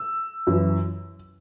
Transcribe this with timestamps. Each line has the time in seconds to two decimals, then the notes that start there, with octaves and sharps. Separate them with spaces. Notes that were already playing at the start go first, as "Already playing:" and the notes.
Already playing: E6
0.47 F#2 E3